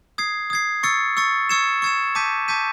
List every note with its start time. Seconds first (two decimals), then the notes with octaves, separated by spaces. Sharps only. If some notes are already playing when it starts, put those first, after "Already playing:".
0.18 D#6 G#6 C7
0.50 D#6 G#6 C7
0.83 C#6 E6 A6 C#7
1.17 C#6 E6 A6 C#7
1.49 C#6 E6 G#6 C#7 E7
1.82 C#6 E6 G#6 C#7 E7
2.15 A5 D6 G6 B6 D#7
2.48 A5 D6 G6 B6 D#7